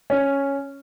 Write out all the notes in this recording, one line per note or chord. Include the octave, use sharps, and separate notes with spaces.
C#4